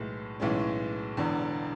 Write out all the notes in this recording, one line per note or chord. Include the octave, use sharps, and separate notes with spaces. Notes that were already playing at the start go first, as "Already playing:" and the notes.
Already playing: B1 A2 E3 G#3
B1 A2 E3 G#3 C#4
E1 E2 D3